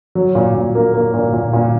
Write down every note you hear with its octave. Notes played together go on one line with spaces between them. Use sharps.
F#3
A#2
A#2
A#3
A#3
A#2
A#2
A#2